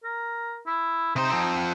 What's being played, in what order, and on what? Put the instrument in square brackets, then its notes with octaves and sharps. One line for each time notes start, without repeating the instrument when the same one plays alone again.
[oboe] A#4
E4
[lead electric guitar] C3 C5 [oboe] D#4
[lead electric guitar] F3 C4
[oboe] F#5